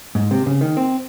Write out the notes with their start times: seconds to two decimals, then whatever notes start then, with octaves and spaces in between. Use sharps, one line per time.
0.15 G#2
0.31 C3
0.46 C#3
0.61 D#3
0.77 C4